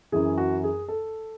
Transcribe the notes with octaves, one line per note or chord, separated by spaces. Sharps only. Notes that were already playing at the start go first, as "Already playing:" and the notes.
F#2 E3 G#4
F#4
G#4
A4